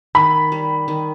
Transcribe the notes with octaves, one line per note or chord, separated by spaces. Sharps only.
D#3 B5
G3
D#3